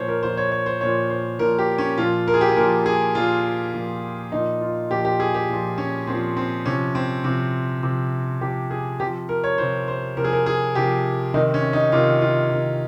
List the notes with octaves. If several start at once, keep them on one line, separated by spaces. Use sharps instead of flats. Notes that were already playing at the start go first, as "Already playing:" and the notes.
Already playing: A#2 F3 C5 C#5
A#4
A#2 F3 C5
C#5
C#5
C5
A#2 F3 C#5
C5
A#2 F3 A#4
G4
C#4
A#2 F3 F4
A#4
G#4
G4
G#4
A#2 F3 A#4
G#4
A#2 F3 F4
A#2 F3
A#2 F3 D#4
F4
A#2 F3 G4
G4
G#4
G4
A#2 F3
C#4
A#2 F3 C4
C4
C3 F3 C#4
C4
C3 F3 C4
C3 F3
C3 F3 G4
G#4
C3 F3 G4
A#4
C#5
C3 F3 C5
C5
C3 F3 A#4
G#4
A#4
G#4
C3 F3 G4
C3 D#3 D#4
C#4
D#4
C3 D#3 F4
F4
C3 D#3